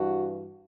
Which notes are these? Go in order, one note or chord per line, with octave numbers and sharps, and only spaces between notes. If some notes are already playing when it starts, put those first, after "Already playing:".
Already playing: G2 E3 F#4